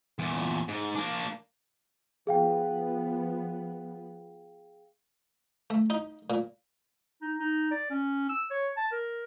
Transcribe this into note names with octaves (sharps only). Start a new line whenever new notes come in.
E2 A#2
G#2
A#3 D4
F3 B3 G#4 F5 G5
A3
D#4
A#2
D#4
D#4
D5
C#4
E6
C#5
A5
A#4